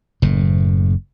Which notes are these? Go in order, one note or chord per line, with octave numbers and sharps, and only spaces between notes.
F#1 A2